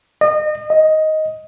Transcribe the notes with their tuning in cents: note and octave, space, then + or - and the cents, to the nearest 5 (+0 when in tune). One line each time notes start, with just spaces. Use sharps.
D#5 -30
D#5 +10